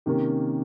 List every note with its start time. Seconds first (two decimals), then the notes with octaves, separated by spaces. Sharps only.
0.06 C3 D#3 A#3 C#4 G4